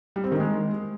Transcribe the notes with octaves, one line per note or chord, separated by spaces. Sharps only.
G3
C4
D#3
G#3